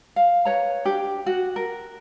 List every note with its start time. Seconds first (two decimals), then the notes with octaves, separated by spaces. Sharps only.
0.16 F5
0.45 B4 C#5 A#5
0.85 D4 G4
1.26 F#4
1.56 A#4